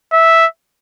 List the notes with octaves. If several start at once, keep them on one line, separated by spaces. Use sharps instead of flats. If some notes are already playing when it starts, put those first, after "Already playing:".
E5